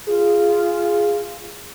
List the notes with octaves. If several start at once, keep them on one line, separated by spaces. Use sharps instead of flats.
F4 G#4